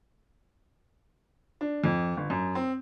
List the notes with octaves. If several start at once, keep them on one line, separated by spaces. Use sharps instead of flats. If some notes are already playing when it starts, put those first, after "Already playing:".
D4
F2
G1
F#2
C4